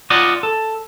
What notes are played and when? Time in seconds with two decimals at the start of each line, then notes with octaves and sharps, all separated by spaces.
0.10 F4 D5 D#5 F5 F#5
0.43 A4